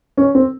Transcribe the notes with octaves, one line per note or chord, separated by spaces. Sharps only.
C#4
C4